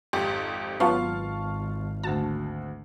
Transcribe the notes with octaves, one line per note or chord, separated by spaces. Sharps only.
G#1 F2 G4
G#1 F#3 B3 F4 F5 A5 C#6
D2 F#4 A5